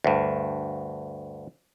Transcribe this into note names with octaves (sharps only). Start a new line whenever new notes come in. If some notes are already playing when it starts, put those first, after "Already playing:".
D2 G2